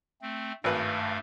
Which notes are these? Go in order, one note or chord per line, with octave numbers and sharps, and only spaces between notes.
A3 C4
G#1 G2 A3 B4 F5